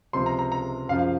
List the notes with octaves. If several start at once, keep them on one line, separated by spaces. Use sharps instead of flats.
C#2 C3 F3 C6
A#5
A#5
A#5
F#2 C#3 F3 F5
F5